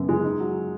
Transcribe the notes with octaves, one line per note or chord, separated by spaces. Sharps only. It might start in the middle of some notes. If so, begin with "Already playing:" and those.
Already playing: F#2 C#3 B3
G#3
D#4
F#3